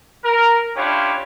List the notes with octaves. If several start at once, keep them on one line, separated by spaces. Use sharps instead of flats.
A#4
C#4 D4 E4 F4 G4 C#5